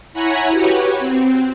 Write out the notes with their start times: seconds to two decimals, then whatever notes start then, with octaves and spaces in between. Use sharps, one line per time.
0.13 E4 C#5 F#5 G#5 A#5 B5
0.51 F#4 G4 B4 C#5
0.99 C4